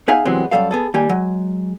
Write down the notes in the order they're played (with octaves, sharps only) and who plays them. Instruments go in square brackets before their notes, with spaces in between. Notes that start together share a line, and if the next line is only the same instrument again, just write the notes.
[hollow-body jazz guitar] B3 D#4 G#4 E5 F5 G#5
C3 E3 F#3 G#3 B3 C4
F#2 D#3 G3 A4 F5
B3 G#4 A4
D#2 G3 A#3 G4 G#5
F#3 G#3